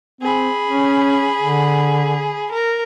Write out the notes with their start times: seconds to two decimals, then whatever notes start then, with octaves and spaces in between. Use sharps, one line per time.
0.21 C4 G#4 B5
0.67 C#4
1.40 D3
2.51 A#4